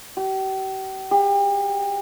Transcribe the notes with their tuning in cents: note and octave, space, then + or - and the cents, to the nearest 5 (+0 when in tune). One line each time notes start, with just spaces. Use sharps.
G4 -40
G4 +35